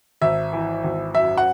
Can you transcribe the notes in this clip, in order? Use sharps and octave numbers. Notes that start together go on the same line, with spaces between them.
G#1 E5
E3
G#1
F#2 E5
F#5